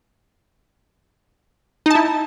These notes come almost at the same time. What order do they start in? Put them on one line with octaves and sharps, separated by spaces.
D#4 A5 E4